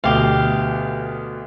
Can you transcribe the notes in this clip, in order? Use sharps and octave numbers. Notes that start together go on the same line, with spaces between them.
D2 B2 G4 F5